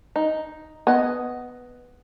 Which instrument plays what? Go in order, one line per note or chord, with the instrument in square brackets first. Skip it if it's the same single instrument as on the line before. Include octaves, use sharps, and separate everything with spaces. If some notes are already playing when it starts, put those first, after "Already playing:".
[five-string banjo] D#4
[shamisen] B3 [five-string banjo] D#5 G#5